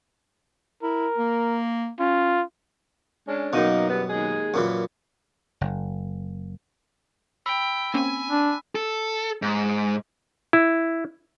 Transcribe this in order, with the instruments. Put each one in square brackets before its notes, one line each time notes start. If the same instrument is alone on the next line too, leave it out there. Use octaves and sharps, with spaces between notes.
[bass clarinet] E4 [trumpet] A#4
[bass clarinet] A#3
[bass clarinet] C#4 [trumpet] F4
[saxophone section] G#3 C#4 D4
[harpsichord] F#2 B2 [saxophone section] F#3 A#3 D#4
[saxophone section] E2 G2 B3
D#2 G#3 G#4
[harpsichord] F#2 A#2 E3
[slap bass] F#1
[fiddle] G5 [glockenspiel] B5 E6 B6
[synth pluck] A#3 C4 C#4 [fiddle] G#5
[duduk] D4
[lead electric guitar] A4
G#2
[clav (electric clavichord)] E4